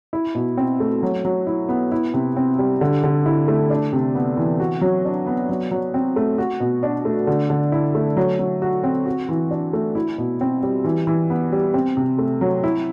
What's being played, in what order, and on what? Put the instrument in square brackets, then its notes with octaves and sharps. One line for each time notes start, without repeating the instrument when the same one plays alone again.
[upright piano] E4
B2
C4
A3
F#3
F#3
E4
B3
E4
C3
C4
G3
D3
D3
E4
A3
D4
C3
B3
E3
F#4
F#3
D4
B3
F#3
F#3
C4
A3
F#4
B2
D4
A3
D3
D3
E4
A3
F#3
F#3
F#4
C4
F#4
E3
D4
A3
E4
B2
C4
G3
E3
E3
B3
G3
C4
C3
A3
F#3
E4